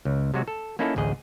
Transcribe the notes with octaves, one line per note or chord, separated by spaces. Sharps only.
C#2
C3 F#3 G#3 F#4
A4
A#3 C#4 D#4 E4 A4
A1 D2 G#4 D#5